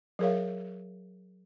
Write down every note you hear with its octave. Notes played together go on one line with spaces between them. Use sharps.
F#3 G#4 A#4 C#5 E5 F5